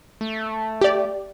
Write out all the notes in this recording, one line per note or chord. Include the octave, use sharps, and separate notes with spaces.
A3
G4 D5